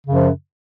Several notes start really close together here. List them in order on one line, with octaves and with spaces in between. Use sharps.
C#3 F#2 F3